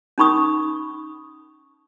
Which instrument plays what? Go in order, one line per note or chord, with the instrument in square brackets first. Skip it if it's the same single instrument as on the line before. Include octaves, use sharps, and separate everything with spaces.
[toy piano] C#4 D#4 B5 C#6 D#6